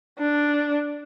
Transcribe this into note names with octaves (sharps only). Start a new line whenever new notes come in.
D4